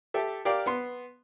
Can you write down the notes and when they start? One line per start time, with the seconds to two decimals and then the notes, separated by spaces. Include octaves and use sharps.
0.14 G4 A4 E5
0.45 G4 A#4 D5 F5
0.66 B3 C6